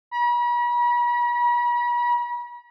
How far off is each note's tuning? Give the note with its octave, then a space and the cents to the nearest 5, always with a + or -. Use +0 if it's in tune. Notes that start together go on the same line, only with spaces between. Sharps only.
B5 -45